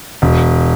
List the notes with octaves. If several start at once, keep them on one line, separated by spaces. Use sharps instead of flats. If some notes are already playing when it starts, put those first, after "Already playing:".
E1